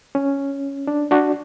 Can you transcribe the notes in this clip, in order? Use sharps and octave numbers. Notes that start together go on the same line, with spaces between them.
C#4
D4
D4 F#4